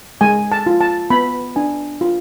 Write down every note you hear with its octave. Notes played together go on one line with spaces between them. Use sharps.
G#3 G#5
A5
F4
A5
B3 B5
D4 G#5
F4